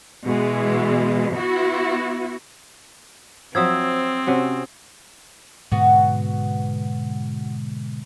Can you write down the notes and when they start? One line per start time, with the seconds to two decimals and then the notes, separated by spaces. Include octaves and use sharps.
0.24 B2 E3 G#3
1.33 B3 E4 F#4
3.55 F3 F#3 C4 E5 D#6 E6 G#6
4.27 C3 C#4 F#4
5.72 G#2 B2 D3 B3 F#4